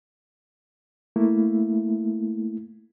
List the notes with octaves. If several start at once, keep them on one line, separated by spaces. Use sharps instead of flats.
A3 A#3 E4